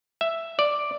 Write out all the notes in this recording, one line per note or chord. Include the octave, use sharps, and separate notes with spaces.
E5
D5